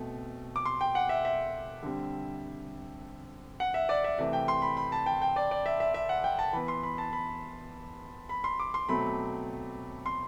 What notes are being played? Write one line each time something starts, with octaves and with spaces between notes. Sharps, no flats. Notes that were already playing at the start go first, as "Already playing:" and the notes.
Already playing: B2 A3 C4
D6
C6
G5
F#5
E5
E5
D3 G3 C4
F#5
E5
D5
E5
C3 E3 A3 E5
G5
C6
B5
B5
A5
G5
G5
D5
D5
E5
E5
E5
F#5
G5
A5
E3 B3 B5
C6
B5
A5
B5
B5
C6
D6
C6
B2 F#3 A3 C4 B5
C6